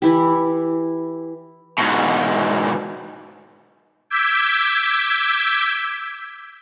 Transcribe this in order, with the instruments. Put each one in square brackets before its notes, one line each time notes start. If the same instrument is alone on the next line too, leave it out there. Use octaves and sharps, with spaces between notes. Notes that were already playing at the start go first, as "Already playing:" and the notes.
[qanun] E3 E4 G4
[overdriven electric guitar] G#2 B2
[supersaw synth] D6 E6 G6 G#6 B6